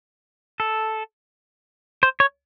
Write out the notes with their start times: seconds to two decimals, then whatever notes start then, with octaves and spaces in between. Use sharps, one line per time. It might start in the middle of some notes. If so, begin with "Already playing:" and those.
0.60 A4
2.03 C5
2.20 C#5